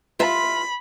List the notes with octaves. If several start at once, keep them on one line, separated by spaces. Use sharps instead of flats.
F4 E5 B5